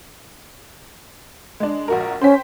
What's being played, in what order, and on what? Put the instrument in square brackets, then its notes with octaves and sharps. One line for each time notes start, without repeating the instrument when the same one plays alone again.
[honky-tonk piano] G#3 D4
A#1 F#4 A#4
[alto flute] C#4 [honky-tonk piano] C5 G5 B6